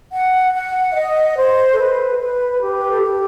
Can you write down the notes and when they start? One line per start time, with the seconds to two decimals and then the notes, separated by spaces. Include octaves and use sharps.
0.11 F#5
0.53 F#5
0.91 E5
0.95 D#5
1.36 C5
1.72 A4
1.78 B4
2.18 B4
2.61 G4
2.77 B4
2.90 A4
3.02 G4